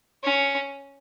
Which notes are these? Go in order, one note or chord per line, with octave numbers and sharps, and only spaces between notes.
C#4